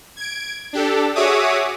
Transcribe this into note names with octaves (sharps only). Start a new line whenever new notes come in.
G#6 D7
D4 G4 A4
F#4 G#4 C#5 E5 D6 D#6